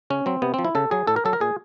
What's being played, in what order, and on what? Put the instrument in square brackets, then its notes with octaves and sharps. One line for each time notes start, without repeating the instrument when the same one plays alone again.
[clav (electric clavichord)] C#3 C#4
F#3 C4
C3 B3
C4
F3
E4
C#3 A4
F#3 G#4
A2 A4
A#4
F#3 A4
A#4
A#2 G#4